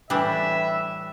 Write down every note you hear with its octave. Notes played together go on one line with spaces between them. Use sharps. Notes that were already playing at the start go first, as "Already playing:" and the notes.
A2 E3 G3 D4 E5